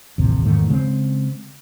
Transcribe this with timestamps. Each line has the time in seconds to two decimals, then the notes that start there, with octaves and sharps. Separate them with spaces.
0.18 A1 D#2 C3
0.46 E2 G#2 D#3 A3
0.69 C#3 G#3 B3 C4